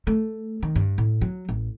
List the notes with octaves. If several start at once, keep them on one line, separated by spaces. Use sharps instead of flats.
A3
D#3
G2
A2
F#3
A1